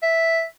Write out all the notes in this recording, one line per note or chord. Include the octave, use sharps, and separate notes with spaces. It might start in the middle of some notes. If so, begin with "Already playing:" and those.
E5